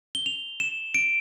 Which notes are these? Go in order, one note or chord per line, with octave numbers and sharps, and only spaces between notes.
G7
F7
E7
D7